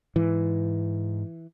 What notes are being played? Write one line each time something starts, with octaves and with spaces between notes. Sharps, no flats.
G#2 E3